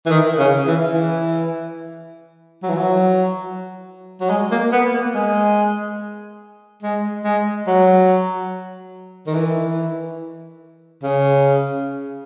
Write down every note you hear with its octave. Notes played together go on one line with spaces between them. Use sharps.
E3
D#3
C#3
E3
E3
F#3
E3
F#3
F#3
G#3
A#3
B3
A#3
G#3
G#3
G#3
F#3
D#3
E3
C#3